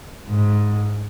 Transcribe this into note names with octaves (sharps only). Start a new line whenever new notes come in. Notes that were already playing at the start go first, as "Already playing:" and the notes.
G#2